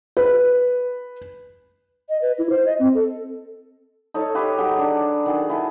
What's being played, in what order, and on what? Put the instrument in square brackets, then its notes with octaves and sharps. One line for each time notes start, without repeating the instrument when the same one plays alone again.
[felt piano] B4
[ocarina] D#5
B4
E4
C5
D#5
C4
A4
[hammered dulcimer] D#4 A4 C#5 D#5
G4 B4 C#5 F5
F#3 G#4
D4
D#3 F#4 G#4
E4 G#5 A5